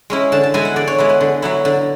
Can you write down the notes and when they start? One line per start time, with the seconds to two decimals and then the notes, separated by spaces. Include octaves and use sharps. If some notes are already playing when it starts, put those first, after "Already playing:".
0.10 G#3 C#4 E4
0.32 D3 A5
0.43 A5
0.54 G#3 B3 E4 G#5
0.65 F#5
0.76 D3 D5
0.87 C#5
0.98 G#3 B3 E4
1.09 B4
1.21 D3
1.42 F#3 B3 E4
1.65 D3